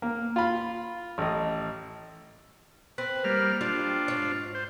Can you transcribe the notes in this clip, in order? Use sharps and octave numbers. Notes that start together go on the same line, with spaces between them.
A#3
F4 B5
A1 D#5
C4 B4
G3 A#3 F6
G3 D4 F4
G#2 C#5
C5